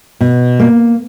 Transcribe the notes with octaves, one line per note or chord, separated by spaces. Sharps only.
B2
A#3